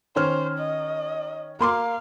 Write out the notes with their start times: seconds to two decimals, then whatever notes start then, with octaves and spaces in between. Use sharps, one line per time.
0.16 D#3 C#4 C5 F6
0.58 D#5
1.60 A#3 F5 C6 D6